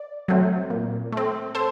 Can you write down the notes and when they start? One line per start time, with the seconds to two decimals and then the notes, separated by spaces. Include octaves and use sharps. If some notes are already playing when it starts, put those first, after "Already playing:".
Already playing: D5
0.28 F#3 A3 C4
0.70 A#2
1.12 A3 C4
1.55 A4 C5